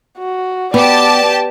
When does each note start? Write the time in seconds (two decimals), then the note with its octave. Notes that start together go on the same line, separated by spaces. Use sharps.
0.18 F#4
0.74 B3 G4 D5 A5